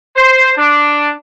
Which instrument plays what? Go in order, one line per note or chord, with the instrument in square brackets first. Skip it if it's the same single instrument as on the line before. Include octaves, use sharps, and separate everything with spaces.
[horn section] C5
D4